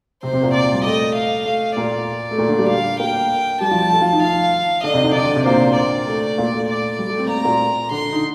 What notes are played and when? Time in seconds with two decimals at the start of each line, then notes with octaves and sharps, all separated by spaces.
0.23 C3 C4 C5
0.33 C3 C4
0.43 A#2 A#3
0.54 D5
0.73 G3
0.84 A3 D#5
1.15 F5
1.45 A3 F5
1.76 A#2 A#3 D5
2.31 A3
2.38 A#2 A#3
2.48 D3 D4
2.58 G3 G4
2.69 F5
3.00 A#3 A#4 G5
3.60 G3 G4 A5
3.71 F3 F4
3.92 A3 A4
4.02 F3 F4
4.12 D#3 D#4
4.23 F5
4.83 D3 D4 D#5
4.94 C3 C4
5.01 D#4
5.04 D3 D4
5.14 D#3 D#4 D5
5.24 D3 D4
5.35 C3 C4
5.46 A#2 A#3 C5
5.76 D5
6.07 A3
6.38 A#2 A#3
6.52 A3
6.69 D5
6.99 G3
7.09 A3
7.19 C4
7.27 A#3 A#5
7.37 A3
7.44 A#2 A#3
7.91 D3 D4 C6
8.12 D#4